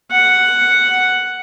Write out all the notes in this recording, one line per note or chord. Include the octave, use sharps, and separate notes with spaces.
F#5